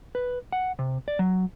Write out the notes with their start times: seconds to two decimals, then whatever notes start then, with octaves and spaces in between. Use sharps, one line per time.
0.15 B4
0.52 F#5
0.79 C3
1.08 D5
1.19 F#3